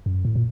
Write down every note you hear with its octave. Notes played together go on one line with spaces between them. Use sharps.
F#2
A2
A#2